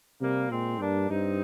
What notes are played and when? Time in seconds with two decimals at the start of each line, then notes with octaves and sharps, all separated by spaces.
0.20 C3 G3 A#3
0.50 A#2 G#3 C4
0.79 G2 A#3 D4
1.10 G2 C4 D#4